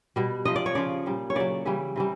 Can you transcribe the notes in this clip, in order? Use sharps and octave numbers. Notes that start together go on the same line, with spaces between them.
B2 G3
C3 F3 D#5
D5
C#5
C#3 F3 D5
A#2 G3
C#5
C#3 F#3 D5
C#3 E3 G3
C3 E3 G3